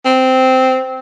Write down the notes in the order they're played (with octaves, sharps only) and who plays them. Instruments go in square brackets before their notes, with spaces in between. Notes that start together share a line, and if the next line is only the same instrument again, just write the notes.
[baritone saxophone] C4